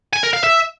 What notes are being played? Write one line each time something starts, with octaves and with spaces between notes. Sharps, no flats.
G#5
A#4
F5
E5